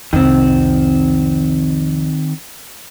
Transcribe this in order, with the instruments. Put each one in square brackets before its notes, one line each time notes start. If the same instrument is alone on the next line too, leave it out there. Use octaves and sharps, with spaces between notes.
[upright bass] C2 F2 [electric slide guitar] D#3 C4